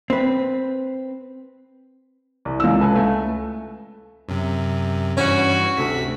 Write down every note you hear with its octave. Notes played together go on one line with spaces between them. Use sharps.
C4 B4
C2
C#2 E6
A4 B4 G#5
A3
F#2 C3
G2 E3 C#4 F#4
D2 C3 B6